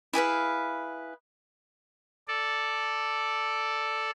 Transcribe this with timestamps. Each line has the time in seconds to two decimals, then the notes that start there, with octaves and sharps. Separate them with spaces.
0.13 E4 G#4 B4 F5
2.28 A4 D5